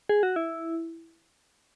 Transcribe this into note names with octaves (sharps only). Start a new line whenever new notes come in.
G#4
F#4
E4